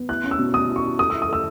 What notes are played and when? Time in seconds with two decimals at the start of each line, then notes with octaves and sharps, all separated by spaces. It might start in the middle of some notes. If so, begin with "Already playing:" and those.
Already playing: B3
0.09 E4 F#6
0.24 C#4
0.31 E6
0.39 B2
0.54 C#4 D#6
0.69 E4
0.76 C#6
0.84 E4
0.99 A3 D#6
1.10 E6
1.14 E4
1.22 D#6
1.29 A3 E6